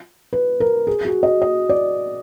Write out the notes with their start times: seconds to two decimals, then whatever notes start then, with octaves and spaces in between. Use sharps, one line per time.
0.33 B4
0.60 A#4
0.87 G#4
1.05 F#4
1.23 D#5
1.42 D#5
1.69 D5